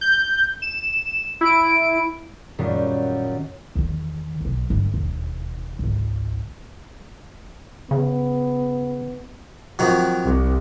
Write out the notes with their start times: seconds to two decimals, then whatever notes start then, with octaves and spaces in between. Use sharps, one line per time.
0.01 G6
0.62 E7
1.41 E4 D7
2.58 F#2 A#2 D#3 G3
3.75 E2 D#3
4.41 B1 F#3
4.70 G1
4.94 E1 D#2
5.79 G#1 C#2
7.91 C#3 B3
9.79 F2 D#3 F#3
10.24 C2